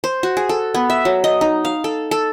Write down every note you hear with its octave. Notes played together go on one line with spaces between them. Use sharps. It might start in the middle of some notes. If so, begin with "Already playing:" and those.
C5
F#4
G#4
A4
B3
E5
F#3
D#5
D#4
F5
A4
A4